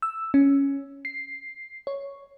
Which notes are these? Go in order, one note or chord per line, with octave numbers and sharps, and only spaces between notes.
E6
C#4
C7
C#5